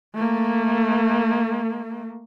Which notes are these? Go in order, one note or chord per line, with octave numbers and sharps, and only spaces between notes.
A3 A#3